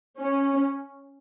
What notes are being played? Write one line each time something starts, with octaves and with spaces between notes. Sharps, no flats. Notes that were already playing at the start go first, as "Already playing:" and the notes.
C#4